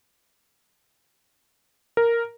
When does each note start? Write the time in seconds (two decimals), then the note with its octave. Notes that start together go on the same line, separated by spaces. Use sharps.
1.97 A#4